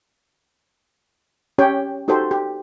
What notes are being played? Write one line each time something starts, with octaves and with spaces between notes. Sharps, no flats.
C#4 G4 C#5 G5
D#4 F#4 G4 A4 C5
G4